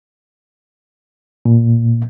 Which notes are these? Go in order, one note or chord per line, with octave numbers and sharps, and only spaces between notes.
A#2